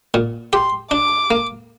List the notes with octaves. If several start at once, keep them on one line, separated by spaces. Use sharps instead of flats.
A#2
G4 C6
D4 D6
A#3